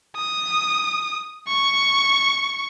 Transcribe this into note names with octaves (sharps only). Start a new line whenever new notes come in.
D#6
C#6